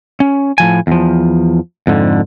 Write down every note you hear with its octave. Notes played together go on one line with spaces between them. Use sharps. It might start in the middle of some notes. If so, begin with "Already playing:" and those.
C#4
A2 F3 G#5
E2 F3
F2 G#2 D3